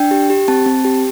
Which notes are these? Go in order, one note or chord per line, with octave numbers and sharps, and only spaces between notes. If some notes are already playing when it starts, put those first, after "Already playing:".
Already playing: D4 G5
G4
G4
C4 A5
C4
G4